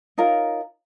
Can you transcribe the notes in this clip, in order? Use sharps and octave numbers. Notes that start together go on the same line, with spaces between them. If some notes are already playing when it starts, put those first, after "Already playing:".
D#4 F4 A#4 C#5